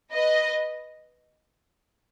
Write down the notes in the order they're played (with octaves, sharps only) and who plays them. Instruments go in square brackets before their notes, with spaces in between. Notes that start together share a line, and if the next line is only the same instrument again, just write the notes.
[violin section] B4 D#5